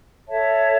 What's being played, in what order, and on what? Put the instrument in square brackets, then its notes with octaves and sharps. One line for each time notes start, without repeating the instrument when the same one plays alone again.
[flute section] A4 C#5 E5 A5